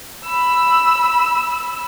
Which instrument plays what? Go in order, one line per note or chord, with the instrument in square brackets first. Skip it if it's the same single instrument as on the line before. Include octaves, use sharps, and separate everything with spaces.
[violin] B5 E6